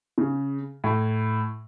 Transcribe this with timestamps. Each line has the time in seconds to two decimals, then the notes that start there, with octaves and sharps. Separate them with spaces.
0.18 C#3
0.84 A2